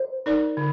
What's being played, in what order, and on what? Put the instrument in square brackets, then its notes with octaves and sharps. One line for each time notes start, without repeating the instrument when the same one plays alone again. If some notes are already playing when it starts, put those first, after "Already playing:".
Already playing: [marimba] C5
[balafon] D#4 A#4 D5
D3